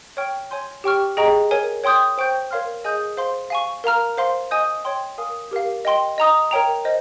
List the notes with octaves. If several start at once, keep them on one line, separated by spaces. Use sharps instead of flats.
C#5 G5 C#6 F6
C#5 G#5 C6 G6
G4 C#5 G5 C#6 F6
G#4 D#5 G5 A#5 C#6
A#4 C#5 G#5
C#5 G5 C6 D#6 G6
C5 G5 C#6 G6
A#4 C#5 F5 C6 F6
G#4 D#5 G#5 D#6 G6
C5 F5 C6
F5 G#5 C#6
A#4 F5 A#5 F6
C5 F5 C6
D#5 G#5 D#6 G6
C#5 G5 C6
A#4 F5 G#5 D#6
G4 A#4 F5
D#5 G5 C6
D#5 A#5 D#6
A#4 C#5 G5 A#5
C5 D#5